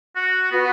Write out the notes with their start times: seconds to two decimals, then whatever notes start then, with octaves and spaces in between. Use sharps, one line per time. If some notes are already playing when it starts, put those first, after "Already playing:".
0.16 F#4
0.51 B3 F#4 B4 F#5